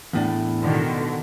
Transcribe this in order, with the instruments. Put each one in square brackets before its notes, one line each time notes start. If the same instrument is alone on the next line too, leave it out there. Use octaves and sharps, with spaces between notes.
[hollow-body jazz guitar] E2 A2 D4
[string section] B2 D3 D#3